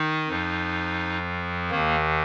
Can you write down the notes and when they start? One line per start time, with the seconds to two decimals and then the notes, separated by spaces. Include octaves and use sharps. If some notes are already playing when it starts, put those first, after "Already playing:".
Already playing: D#3 D#4
0.28 F2 F3
1.71 D#2 D#3 A#3